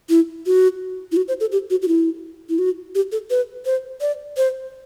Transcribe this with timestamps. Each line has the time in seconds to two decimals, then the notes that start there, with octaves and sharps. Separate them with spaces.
0.10 E4
0.46 F#4
1.12 E4
1.17 F#4
1.28 C5
1.41 A4
1.52 G4
1.70 F#4
1.82 F#4
1.88 E4
2.49 E4
2.59 F#4
2.95 G4
3.12 A4
3.30 B4
3.65 C5
4.01 D5
4.37 C5